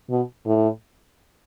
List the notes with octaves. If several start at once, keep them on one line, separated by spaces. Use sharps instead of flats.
B2
A2